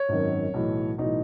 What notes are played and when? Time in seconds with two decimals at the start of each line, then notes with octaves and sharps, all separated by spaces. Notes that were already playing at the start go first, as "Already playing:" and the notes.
Already playing: C#5
0.09 G#1 F#2 D#3
0.54 B1 A2 E3
0.98 B1 A2 E3 D#4